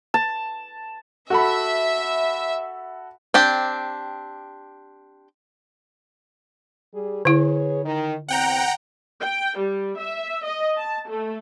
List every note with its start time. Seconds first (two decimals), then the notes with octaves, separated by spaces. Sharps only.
0.14 A5
1.30 F#4 A4 E5 B5
3.34 C4 D4 G4 G5
6.94 G3 G#4
7.25 D3 E4 G#4 B4 C#5
7.84 D#3
8.29 E2 C4 F#5 G5 A#5
9.21 G5
9.58 G3
9.98 E5
10.44 D#5
10.77 A5
11.09 A3